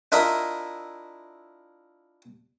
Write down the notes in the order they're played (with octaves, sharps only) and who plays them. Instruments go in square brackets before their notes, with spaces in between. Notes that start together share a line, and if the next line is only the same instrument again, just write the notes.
[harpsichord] D4 E4 F4 A#4 D#5 E5